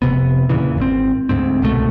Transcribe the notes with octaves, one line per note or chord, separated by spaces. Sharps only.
F1 C3 B3
E2 A#2 C#3 E3
G#1 C4
D2 G#2 C4
C2 G#2 B2 A3